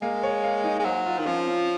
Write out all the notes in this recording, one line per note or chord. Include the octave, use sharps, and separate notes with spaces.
G#3 A#3
C#5
A#3
D#4
G#3
F#3 C5
F4
D#3
F3 C#4
C#4